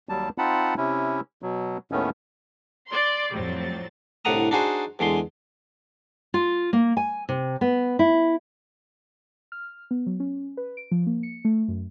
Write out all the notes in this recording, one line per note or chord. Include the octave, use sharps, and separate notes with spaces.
D#2 F#3 G3 A5
C4 D#4 F4 F#5 A5 B5
C3 C#4 E4
B2 F#3
D#2 A2 D#3 A3 B3 C#4
D5 C6
F2 A2 F#3 G3 C4 A6
C2 A2 D3 F#5 A#5 D#6
D4 D#4 F#4 G#4 C5
E2 D3 G#3 C6
F4
A#3
G#5
C3
B3
E4
F6
B3
F#3
C#4
B4
D7
F3
A#3
C#7
A3
F#2